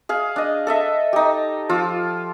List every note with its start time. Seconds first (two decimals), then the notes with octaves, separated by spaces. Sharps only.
0.09 G#4 F5
0.36 D4 D#5
0.67 A4 D#5 E5
1.13 D#4 G4
1.69 F3 F4 D6 E6